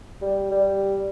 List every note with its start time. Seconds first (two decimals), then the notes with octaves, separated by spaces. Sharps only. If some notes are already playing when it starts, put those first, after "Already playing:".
0.21 G3
0.51 G3